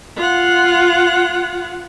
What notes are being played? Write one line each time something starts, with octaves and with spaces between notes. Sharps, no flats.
F4 F#5